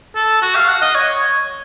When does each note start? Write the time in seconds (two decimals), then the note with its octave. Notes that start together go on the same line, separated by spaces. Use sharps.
0.15 A4
0.42 F#4
0.56 F5
0.69 F#5
0.82 D#5
0.95 C#5